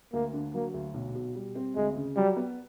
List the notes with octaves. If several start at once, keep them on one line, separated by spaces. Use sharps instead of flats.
D2 A#3
D3
F#3 A#3
D2
B1
B2
G3
C4
D2 G#3
C#3
F#3 G3
B3